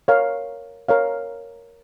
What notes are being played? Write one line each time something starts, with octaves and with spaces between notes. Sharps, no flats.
A#4 C#5 F5
A#4 C#5 F5